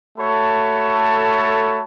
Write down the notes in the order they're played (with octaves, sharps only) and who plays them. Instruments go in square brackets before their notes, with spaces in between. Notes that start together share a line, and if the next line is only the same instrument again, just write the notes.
[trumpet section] A3 F#4 A4 C#5 A5 B5